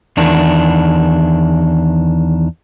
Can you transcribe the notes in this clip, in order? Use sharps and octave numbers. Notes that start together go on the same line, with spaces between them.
E2 D#3 D4